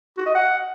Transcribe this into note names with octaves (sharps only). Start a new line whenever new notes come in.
F#4
D#5
F#5